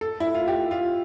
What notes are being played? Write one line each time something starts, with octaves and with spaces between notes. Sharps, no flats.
A4
E4
F4
G4
F4